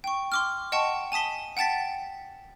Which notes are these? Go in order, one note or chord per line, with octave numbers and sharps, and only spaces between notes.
G5 C#6
C6 D6 F6
D#5 F#5 G5 A5 C#6
G#5 A5 D#6 B6 G7
F#5 G5 A5 A6 B6